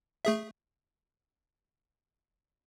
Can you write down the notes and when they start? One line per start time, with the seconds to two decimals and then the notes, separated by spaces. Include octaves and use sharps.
0.25 A3 G#4 E5